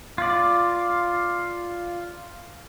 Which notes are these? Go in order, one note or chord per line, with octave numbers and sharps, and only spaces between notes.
F4 D5